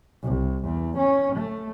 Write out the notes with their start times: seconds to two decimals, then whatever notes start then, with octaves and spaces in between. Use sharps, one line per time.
0.23 C2
0.64 E2
0.98 C#4
1.36 A3